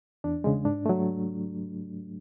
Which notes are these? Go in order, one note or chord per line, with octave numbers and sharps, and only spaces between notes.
E2 D4
C#3 G#3
G#2 D4
F#3 A3